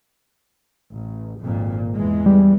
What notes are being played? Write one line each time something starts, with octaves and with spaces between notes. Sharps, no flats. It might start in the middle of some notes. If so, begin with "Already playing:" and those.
A1
G#1 F2 A#2
E2 E3 G#3
G3